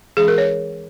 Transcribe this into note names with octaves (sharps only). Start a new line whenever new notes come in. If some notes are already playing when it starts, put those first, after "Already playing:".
E3 G#3 C#4 G#4
A#4
C#5